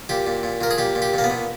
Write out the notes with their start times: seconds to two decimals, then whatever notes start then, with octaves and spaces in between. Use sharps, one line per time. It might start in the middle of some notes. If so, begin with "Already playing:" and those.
0.09 A#2 G4
0.27 A#2
0.43 A#2
0.61 A#2 A#4
0.71 G#4
0.78 A#2 G4
0.95 A#2
1.02 G4
1.14 A#2 A#3
1.24 B3
1.30 A#2